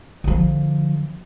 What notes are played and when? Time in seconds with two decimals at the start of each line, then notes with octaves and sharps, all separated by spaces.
0.24 D3 F3